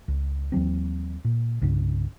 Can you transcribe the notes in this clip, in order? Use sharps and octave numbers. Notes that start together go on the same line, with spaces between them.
C#2
D#2 E3 F#3 C4
A#2
C2 G2 C#3